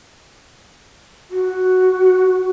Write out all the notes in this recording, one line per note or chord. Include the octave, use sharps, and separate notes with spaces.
F#4